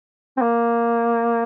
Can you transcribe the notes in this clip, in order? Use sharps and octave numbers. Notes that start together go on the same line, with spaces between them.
C4
A#3